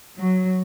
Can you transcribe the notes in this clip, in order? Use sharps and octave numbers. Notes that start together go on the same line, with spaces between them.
F#3